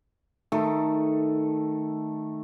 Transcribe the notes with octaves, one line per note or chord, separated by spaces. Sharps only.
D#3 A3 A4